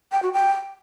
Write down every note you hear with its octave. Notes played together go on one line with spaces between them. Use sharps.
G5
F#4
G5